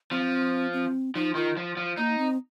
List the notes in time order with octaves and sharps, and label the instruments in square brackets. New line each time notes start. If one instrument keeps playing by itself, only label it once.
[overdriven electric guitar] F3 [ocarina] C4
[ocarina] C4
[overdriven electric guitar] F3 [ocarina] D#4
[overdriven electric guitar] D#3 [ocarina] F4
[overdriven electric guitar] F3
F3
[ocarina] A#3 [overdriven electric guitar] D#4
[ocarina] C4